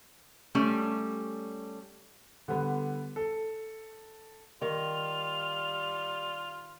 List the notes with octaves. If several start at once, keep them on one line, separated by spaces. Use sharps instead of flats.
G3 A3 C#4
D3 G3 B3
A4
D#3 G3 F4 F7